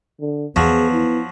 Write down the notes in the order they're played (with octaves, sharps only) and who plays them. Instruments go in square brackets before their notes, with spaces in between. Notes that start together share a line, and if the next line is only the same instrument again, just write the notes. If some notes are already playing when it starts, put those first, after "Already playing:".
[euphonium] D3
[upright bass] E2 [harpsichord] F3 F#3 [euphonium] B3 [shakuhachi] G#4
[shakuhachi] E4